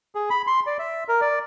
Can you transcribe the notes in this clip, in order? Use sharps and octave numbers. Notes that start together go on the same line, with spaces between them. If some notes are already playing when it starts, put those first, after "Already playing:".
G#4
B5
C6
D5
E5
A#4
D5